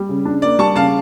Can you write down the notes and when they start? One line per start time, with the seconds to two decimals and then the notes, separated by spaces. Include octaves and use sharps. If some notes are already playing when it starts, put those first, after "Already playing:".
Already playing: G3
0.09 C#3
0.25 D4
0.42 A#3 D5
0.59 G3 A5 C#6
0.76 C#3 F5 A5